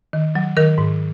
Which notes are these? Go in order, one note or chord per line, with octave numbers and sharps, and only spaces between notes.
D#3
F#3
D#3 A#4
G#2